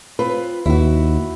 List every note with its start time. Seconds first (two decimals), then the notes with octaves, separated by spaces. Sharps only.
0.19 C4 F4 B4
0.66 D#2 E4 F#4